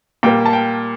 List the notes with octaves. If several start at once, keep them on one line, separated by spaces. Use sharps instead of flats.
A#2 G3 A#3 G5
A5
G5